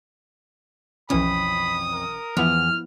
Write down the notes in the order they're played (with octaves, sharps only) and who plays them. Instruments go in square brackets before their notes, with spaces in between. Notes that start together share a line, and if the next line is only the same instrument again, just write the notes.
[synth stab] B1 E3 C#4 [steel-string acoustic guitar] F2 [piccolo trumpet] B5 [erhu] D#6
[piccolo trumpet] A#4
[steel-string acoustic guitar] E2 [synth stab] F3 B3 E4 [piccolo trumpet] F6